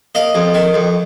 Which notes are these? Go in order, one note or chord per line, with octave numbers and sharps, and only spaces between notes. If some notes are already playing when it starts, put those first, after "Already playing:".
A#3 D#5
F2
D#3
F2